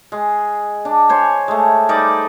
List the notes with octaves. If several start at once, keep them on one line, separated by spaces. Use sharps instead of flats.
G#3
D4
C5 C#5 G#5
G#3 A3
G3 D#4 D5